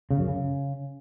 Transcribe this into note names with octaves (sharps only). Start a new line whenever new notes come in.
C#3
F#2
C#3